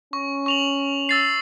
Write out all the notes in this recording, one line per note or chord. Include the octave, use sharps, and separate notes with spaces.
C#4 C#6
C#6 F7 F#7
E6 A6 C7